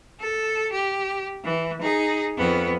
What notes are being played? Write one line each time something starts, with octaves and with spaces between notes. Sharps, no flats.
A4
G4
E3
D#4 G#4
F2 B3